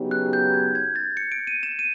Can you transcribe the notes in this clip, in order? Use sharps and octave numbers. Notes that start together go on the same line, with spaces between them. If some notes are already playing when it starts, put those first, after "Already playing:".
Already playing: C#3 F#3 B3 D#4 G4
F#6
G6
G#6
G#6
A6
C#7
D7
D#7
E7
D#7